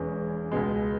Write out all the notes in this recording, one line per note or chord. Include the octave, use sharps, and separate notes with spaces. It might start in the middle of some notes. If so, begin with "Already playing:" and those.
Already playing: E1 E2 E3 G#3 C#4
C#2 B2 G#3